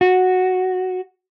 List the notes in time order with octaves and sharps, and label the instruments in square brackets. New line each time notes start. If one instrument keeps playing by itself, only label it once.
[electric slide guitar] F#4